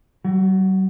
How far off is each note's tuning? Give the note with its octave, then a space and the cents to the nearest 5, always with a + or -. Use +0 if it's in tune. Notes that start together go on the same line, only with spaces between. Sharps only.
F#3 +45 F#4 +0